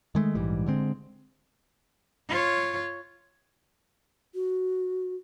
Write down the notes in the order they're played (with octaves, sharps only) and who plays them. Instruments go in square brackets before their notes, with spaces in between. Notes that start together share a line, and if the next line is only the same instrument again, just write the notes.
[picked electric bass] D#3 G#3 A3
A#1 G#2 E3 G3
D3 G#3 C4
[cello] F4 C#5
[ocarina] F#4